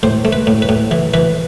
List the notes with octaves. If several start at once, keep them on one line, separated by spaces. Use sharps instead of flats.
A2 C5
A3
B4
A2
B4
A2
E3
E3 B4